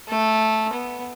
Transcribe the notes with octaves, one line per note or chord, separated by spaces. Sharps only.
A3
B3